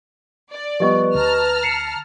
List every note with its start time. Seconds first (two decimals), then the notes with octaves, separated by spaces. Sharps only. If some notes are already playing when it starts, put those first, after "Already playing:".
0.50 D5
0.80 F3 G3 B3 G4 B4 D#5 C#6
1.15 D2 D3 A5 A#5 F6
1.63 C7 C#7 E7